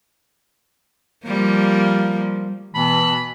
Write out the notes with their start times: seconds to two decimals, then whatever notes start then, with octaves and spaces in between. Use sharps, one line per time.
1.26 F3 G3 A#3
2.74 B2 E3 A5 B5